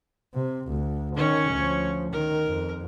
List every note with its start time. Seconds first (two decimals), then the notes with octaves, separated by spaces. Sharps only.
0.34 C3
0.68 D2
1.16 D#3 C#4 C#5
1.51 D2 F3
2.13 D#3 A#4
2.46 F2